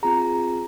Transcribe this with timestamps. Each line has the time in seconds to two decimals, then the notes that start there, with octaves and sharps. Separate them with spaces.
0.03 C4 F4 G#4 A#5